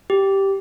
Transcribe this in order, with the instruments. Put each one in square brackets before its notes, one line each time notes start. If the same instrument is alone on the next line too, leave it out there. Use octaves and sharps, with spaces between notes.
[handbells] G4